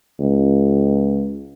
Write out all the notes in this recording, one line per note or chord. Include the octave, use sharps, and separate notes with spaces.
C#2